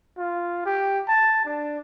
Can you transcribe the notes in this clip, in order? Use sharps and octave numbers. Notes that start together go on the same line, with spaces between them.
F4
G4
A5
D4